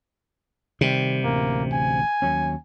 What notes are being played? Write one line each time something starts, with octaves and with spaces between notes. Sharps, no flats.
C3 D#3 G3
A1 D2 A#3
G#5
D#2 F#3 C#4